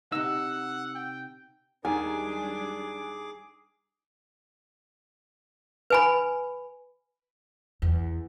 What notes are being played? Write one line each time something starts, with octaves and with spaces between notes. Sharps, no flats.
C3 D#4 F#5 E6
G5
D#2 D#3 G3 D4 G#4 G#5 D6
B4 G#5 B5
E2